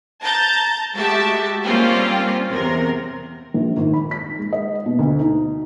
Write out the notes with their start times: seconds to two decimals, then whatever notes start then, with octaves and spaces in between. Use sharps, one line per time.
0.22 A5 A#5 G6 A6
0.95 G#3 A3 F#4 G4 E5 A5
1.64 G3 A#3 C4 C#4 F4 G4
2.51 E2 C3 A#4
3.54 A#1
3.77 G#1
3.93 B5
4.11 B6
4.39 G#3
4.53 D#5
4.86 B2
4.99 D2
5.19 D#4